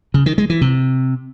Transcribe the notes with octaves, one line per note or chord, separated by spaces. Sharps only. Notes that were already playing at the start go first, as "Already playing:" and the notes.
C#3
D#3
G#3
E3
C3